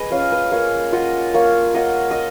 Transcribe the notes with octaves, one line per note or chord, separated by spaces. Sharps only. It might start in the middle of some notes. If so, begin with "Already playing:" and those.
Already playing: G#4 B4 D#5
C#4 F4 C#5 F5
B4 D#5
A#3 C#5 F5
F4 D#5 F#5
A#3 C#5 F5
F4 D#5 F#5
D#5